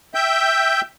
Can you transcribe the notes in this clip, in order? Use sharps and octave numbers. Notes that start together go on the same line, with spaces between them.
E5 G5 G6